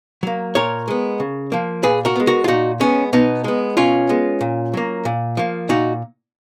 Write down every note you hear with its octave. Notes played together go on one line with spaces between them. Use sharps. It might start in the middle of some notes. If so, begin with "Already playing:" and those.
F#3 A#3
A#2 A#4 C#5
G#3 B3
C#3
F3 A#3
A#2 G#4 B4
F#4 A#4
G#3 B3
F#4 A#4
F4
A#2 D#4 F#4
G#3 B3 C#4
B2 B3 D#4
G#3 B3
B2 C#4 F4
G#3 B3
A#2
F#3 A#3
A#2
F3 A#3
A#2 D#4 F#4